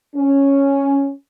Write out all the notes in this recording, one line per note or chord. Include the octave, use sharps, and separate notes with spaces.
C#4